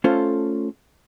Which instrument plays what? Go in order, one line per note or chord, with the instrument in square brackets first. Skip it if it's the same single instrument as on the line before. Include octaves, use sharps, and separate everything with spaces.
[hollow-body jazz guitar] A3 C#4 F4 A4 C5